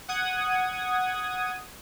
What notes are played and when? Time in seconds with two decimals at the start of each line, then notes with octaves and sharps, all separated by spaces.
0.08 F#5 D#6 G#6